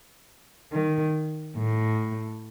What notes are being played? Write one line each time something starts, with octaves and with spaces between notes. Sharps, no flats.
D#3
A2